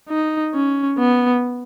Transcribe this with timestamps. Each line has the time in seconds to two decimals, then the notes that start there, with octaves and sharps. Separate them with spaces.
0.09 D#4
0.54 C#4
0.99 B3